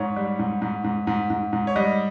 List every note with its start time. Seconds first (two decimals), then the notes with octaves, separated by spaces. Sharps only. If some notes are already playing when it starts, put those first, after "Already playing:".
Already playing: G#2 C#5
0.16 G3
0.39 G#2
0.62 G#2
0.84 G#2
1.07 G#2
1.30 G#2
1.53 G#2
1.67 C#5
1.76 G3 D#5